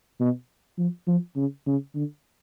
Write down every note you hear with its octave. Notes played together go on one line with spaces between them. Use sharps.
B2
F3
F3
C#3
C#3
D3